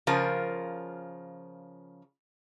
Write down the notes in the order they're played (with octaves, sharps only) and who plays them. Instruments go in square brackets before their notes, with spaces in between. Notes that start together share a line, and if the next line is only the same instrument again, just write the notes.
[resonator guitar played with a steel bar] C#3 F3 F4 A#4 C5